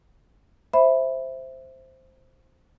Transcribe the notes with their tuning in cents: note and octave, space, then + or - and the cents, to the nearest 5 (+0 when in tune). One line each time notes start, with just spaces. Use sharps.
C5 +0 E5 +0 B5 +0